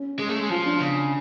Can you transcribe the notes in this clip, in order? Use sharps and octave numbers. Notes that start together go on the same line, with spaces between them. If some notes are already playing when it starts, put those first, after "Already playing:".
Already playing: C#4
G#3
A3
G#3
F3 F4
D4
C#3